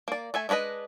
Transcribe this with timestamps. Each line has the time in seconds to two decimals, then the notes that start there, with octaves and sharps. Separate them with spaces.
0.08 A#3 D5
0.34 A3 E5 G#5
0.49 G#3 D4 F#4 B4 D#5